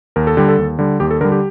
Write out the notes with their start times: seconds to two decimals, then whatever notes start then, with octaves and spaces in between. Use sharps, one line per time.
0.16 D#2 A#4
0.27 A4
0.37 D3 G3 G4
0.49 A4
0.58 D#2
0.79 D3 G3
1.00 D#2 G4
1.11 A4
1.21 D3 A#4
1.25 G3
1.32 G4